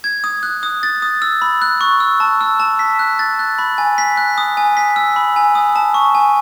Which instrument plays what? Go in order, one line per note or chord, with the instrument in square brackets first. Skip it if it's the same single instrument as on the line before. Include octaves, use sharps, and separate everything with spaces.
[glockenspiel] G#6
D#6
F#6
D#6
A6
D#6
E6
B5
F#6
C#6
E6
A5
E6
A5
B6
F#6
A6
F#6
B5
G#5
B6
F#6
D#6
G#5
B6
E6
B5
G#5
D#6
A5
C#6
G#5